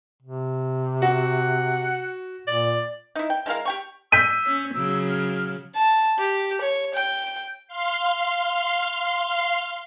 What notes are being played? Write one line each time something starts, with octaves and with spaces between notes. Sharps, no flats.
C3
F#4 F#5
A#2 D5
D#4 E4
G5
G#3 E4 A#4 F5
G4 G5 C#6
E6 G6 B6 D#7
C#4
C#3 F#3 E6
F6
A5
G4
C#5
G5
F5 C6